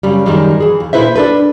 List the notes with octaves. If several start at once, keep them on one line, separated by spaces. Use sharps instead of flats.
F#2 C#3 G3
F#2 D#3 G3 G#3
E3 G#4
D#2
A#2 D#3 E4 B4 C5 E5
D4 A4 B4